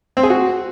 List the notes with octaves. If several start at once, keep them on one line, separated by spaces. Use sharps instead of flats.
C4
G#4
F#4